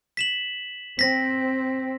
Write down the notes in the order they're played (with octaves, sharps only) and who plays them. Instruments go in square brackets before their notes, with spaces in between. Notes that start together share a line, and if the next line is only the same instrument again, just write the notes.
[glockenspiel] B6 E7 F#7
[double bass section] C4 [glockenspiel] A#6 B6